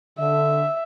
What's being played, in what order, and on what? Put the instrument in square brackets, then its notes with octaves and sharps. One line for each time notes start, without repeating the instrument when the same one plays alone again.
[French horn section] D3 [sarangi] E5